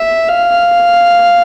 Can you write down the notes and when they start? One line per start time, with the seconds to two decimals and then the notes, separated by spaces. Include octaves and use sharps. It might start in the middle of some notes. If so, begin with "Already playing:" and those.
Already playing: E5
0.29 F5